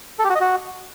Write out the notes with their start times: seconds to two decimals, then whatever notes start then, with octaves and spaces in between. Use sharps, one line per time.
0.19 A4
0.24 G4
0.30 F#4
0.35 D#5
0.40 F#4